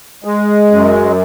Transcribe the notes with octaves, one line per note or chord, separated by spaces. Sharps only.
G#3
F#2